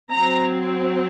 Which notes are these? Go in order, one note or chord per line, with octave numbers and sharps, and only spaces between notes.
F#3 C4 A#5